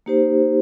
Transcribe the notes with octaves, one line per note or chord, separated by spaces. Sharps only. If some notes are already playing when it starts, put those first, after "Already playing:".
A#3 D#4 G4 C5